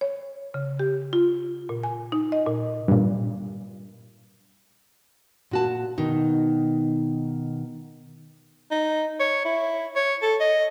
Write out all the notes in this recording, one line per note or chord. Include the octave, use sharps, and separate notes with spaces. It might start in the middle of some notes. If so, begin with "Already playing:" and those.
C#5
C#3
G4
F4
A#2
G#5
D#4
D#5
A#2
G2 A#2
A#2 F#4 A5
B2 D#3 D#4
D#4
C#5
E4
C#5
A4
D#5